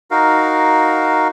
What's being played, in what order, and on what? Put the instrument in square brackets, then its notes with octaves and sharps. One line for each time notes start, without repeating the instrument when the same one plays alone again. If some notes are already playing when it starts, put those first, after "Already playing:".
[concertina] D#4 F#4 A#4 F5